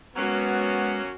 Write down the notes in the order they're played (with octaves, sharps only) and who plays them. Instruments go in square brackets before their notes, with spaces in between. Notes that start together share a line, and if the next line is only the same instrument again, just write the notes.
[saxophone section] F#3 A#3 C#4 [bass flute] G#3 [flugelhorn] B3 [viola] F#4